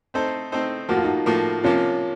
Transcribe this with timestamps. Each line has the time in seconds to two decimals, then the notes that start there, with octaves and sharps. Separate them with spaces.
0.14 A3 C4 D#4 A4 C5
0.52 A3 C4 D#4 A4 C5
0.89 A2 F3 A#3 F#4
0.97 F4
1.04 D#4 F#4
1.26 A2 F3 A#3
1.63 C3 F3 A#3 C#4 F4